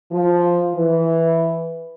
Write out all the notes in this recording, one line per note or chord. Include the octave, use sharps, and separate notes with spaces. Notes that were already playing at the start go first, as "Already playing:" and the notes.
F3
E3